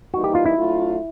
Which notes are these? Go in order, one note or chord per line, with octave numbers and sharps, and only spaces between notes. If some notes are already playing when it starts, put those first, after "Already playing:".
E3 G3 A#3 D#4 F#4
G4
F4
E4
F#3 A3 D4 F4